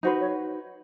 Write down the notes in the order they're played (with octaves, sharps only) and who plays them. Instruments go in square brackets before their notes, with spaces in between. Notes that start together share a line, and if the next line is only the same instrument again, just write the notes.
[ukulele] D#4 F#4 B4 [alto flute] C5
[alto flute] C#5